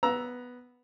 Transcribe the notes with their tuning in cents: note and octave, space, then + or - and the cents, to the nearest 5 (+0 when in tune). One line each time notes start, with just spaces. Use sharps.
B3 +0 A#5 +20 E6 +0